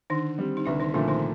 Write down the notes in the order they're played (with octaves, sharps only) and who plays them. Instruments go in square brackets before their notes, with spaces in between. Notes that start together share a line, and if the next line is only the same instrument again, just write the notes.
[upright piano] D3 [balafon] D#3 D#4
[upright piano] G3 C4
[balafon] D#4
[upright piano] C2 [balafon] D3 D4
[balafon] D#3 D#4
[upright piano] A#2 F3 A3 [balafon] D3 D4
[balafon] D#3 D#4